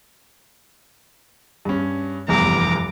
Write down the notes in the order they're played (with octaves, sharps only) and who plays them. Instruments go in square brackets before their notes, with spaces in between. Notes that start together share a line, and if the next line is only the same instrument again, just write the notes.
[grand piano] G2 C#4
[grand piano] F1 E2 G2 [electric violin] A#5 D6